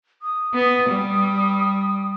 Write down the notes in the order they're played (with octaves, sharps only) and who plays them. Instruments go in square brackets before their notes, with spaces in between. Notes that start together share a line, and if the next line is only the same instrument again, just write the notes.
[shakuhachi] D#6
[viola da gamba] B3
G3